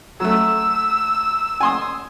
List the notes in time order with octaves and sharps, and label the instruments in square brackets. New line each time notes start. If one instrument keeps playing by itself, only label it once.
[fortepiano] F#3 A3 [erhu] E6
[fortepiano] G#5 C6 D#6